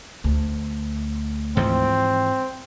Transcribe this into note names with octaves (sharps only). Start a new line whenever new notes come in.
D2
G#2 E3 F3 C4